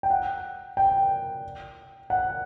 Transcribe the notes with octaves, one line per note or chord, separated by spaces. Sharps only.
G5
F#5
G5
F#5